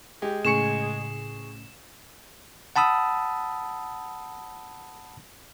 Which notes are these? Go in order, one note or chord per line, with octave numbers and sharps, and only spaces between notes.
G#3 G4
A2 C#3 G#4 C#6 C#7 E7
F#5 A5 B5 D#6 E6